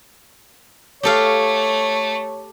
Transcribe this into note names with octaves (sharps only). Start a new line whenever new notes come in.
A3 G4 A4 C#5 F5